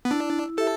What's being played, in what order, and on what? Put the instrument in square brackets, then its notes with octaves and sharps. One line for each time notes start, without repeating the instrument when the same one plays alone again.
[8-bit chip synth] B3
[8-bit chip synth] D4 [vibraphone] E4
[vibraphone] G4 E5 [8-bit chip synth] A4